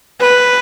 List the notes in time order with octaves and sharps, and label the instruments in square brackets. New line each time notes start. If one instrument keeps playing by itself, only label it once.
[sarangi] B4